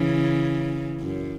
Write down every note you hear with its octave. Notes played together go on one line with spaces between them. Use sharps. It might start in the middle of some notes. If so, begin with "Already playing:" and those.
Already playing: C#3 E3
F#2